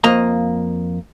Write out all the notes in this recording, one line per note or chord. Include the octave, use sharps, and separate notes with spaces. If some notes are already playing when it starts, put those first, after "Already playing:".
F2 A#3 D#5 A#5